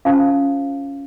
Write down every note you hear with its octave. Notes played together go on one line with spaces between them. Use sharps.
C#4 F4 C5 F5 A5